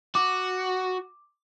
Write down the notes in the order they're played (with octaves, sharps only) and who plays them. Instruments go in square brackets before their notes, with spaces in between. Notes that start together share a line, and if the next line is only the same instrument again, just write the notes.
[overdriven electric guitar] F#4 [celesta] D6